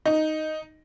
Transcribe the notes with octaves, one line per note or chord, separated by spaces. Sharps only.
D#4